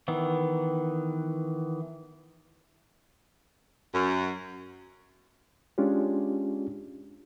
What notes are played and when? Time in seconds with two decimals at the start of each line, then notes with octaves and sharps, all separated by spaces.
0.08 D#3 E3 B3
3.94 F#2
5.78 G#3 C#4 D4 F4 G4